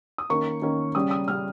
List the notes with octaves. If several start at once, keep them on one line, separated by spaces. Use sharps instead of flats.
D#6
D#3 A#3 C#4 C#6
D#3 A#3 C#4
C#3 G3 C#4 D#6
D#6
C#3 G3 C#4 F6